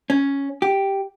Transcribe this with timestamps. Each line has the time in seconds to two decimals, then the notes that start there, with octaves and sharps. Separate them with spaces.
0.10 C#4
0.62 G4